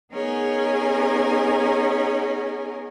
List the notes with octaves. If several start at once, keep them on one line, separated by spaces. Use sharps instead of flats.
B3 C#4 D#4 G#4 A#4 G#5